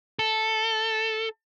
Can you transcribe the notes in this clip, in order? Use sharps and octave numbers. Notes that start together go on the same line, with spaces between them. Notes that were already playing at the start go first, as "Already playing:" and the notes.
A4